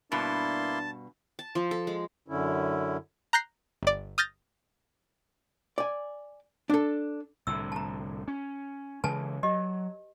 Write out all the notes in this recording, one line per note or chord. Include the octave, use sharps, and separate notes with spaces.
G2 B2 A#3 D4 E4 A5 C6
A5
F3
A4
G#3
F#2 D3 C#4 E4
A#5 F#6 G6 A#6 C7
G1 D5
D#6 F6 G6 A6 A#6
D5 G#5
D4 A4
C2 A2 D3 E6
A5 A#5
C#4
C#3 E3 G#3 B4 G#5 A5
F#3 G4 D#5